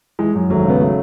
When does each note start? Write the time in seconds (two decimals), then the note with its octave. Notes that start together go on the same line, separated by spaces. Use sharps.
0.19 E3 G#3
0.35 F#2
0.50 G#1 F#3 A3
0.65 C#3 B3
0.81 F#3 A3